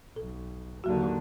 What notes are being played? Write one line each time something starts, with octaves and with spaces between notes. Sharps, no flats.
B1 A4
D#2 D3 F#3 F#4